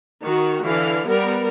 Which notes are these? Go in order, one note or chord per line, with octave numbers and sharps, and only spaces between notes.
D#3 F#4
D3 E3 F5
G3 B3 A#4